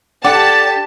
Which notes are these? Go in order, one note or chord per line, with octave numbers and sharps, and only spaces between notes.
D4 G4 A4 D5 F#5 G5 A5